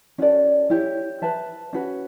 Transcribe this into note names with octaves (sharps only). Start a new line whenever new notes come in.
C#4 F#4 A4 D5
E4 G4 C#5
B4 E5 A5
C#4 F#4 B4